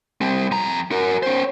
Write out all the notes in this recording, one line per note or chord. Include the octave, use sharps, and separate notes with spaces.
G3 C4
F2 A#5
F#4 A#4
C#4 C5